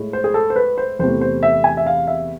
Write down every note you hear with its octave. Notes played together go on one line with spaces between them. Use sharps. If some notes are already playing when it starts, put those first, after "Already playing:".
Already playing: A2 G#3
C5
G#4
A4
C5
B4
C5
E2 C3 E3 A3 C5
C5
E5
G#5
E5
F5
E5